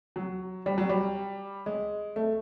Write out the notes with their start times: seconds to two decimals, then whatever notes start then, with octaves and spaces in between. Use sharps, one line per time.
0.16 F#3
0.66 G3
0.78 F#3
0.89 G3
1.66 G#3
2.16 A3